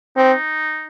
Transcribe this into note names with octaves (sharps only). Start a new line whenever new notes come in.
C4 D#4